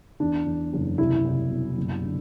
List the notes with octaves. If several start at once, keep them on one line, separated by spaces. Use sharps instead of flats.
E2 D4
E2
F#1
C2 E4
C2
B2
F#1
D3